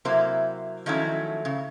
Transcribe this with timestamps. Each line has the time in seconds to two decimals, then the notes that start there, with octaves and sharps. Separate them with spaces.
0.05 C3 F#3 A#3 E4 C5
0.86 D#3 F3 F#3 A3 C#4 E4
1.45 C#3